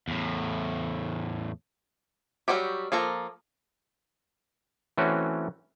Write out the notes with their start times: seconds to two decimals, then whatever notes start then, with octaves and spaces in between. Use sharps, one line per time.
0.08 E2 A2
2.48 F#3 G3 A#3 F#4 G4
2.92 F3 A#3 A4 A#5
4.98 E3 A3 C4 C#4 F#4